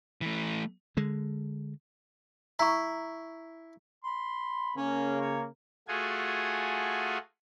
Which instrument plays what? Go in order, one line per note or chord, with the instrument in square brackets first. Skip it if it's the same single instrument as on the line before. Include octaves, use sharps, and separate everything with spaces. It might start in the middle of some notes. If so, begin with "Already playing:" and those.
[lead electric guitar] E3 A3
[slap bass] D3 G#3
[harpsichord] E4 [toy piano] A#5 C#6
[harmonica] B5 C6
[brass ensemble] C#3 A#3 [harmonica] C#4
[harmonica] C#5
[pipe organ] A3 F4 F#4 G#4 G#5